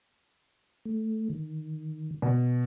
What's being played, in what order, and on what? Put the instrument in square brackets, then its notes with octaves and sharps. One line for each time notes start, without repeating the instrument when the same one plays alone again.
[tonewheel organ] A3
D#3
[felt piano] B2